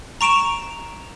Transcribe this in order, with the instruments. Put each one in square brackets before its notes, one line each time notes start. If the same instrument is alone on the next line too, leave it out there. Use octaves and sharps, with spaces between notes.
[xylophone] A#5 C#6 D7 E7 F7